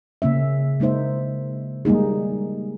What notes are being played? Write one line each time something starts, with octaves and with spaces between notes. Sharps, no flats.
C#3 A#3 C#4 E5
G#3 A#3 D#4 C5 E5
G3 G#3 A#3 D#4 G#4